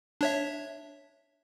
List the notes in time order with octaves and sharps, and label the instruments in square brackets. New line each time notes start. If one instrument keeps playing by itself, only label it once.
[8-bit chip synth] D4 C#5 E5